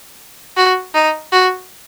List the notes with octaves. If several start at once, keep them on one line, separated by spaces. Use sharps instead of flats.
F#4
D#4
F#4